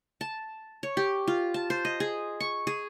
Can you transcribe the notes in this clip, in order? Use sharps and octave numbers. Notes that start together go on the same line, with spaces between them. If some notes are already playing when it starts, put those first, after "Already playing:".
A5
C#5
G4
F4
A5
C5
D#5
G#4
C#6
G#4